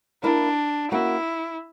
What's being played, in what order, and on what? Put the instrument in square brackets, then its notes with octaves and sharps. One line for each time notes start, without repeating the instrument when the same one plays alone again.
[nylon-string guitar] A#3 E4 A#4 [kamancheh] D4
[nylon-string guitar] A#3 C#4 F#4 [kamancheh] E4